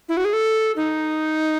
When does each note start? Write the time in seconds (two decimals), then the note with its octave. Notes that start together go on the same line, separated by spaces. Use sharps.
0.09 E4
0.17 F#4
0.25 G#4
0.33 A4
0.76 D#4